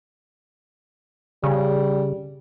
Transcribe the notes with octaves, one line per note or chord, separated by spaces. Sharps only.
C#3 G3